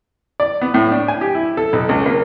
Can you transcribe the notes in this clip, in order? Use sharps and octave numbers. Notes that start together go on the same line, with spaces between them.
D5
B3
A2
D4
G#5
G4
E4
A4
B1
C#2
A#3